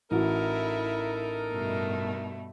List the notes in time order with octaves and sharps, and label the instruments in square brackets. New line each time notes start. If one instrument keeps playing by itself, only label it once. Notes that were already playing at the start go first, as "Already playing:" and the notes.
[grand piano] A1 F#4 [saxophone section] D#4 A4 A#4 [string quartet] E4
[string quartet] G2 B2 A3